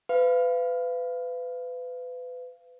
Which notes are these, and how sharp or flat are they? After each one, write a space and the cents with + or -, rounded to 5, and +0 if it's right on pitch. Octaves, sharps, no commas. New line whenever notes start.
B4 +30 F5 -25